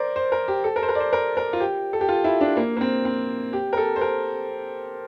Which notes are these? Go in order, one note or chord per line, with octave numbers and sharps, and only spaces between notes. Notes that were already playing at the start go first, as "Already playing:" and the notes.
Already playing: A#4 C5 D5
C5
A#4
G4
A4
A#4
C5
A#4
D5
C5
A#4
A#4
F4
G4
A4
G4
F4
E4
D4
A#3
A#3
C4
C4
G4
A#4
A4
C5
A#4